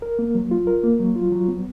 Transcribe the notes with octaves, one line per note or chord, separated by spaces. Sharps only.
A#4
A#3
F#3
F4
A#4
A#3
F#3
F4
F#3
B3